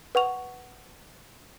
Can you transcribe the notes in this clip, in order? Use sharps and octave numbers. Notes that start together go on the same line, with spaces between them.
B4 F#5 C#6 F7